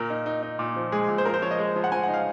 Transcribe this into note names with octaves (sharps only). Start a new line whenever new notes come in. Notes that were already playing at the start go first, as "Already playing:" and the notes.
Already playing: A#2 A#4
D#4
D#4
D#4
A#2
F3
G#3 G#4
A#2
C5
F3 A#4
C5
F3 C#5
D#5
G#3
F3
F#5
F3 G#5
D#4 F#5
F5